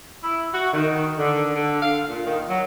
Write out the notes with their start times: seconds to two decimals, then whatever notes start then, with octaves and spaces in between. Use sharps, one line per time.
0.24 E4
0.54 F#4
0.74 D#3
1.19 D3
1.54 D3
1.82 F5
2.09 A#2
2.26 D#3
2.50 F#3